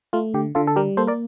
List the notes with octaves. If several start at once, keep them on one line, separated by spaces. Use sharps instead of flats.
A3 F4
D3 G4
D3 F4 A4
A4
G3 G4 A#4
A#3 A4 C5
A#4 D5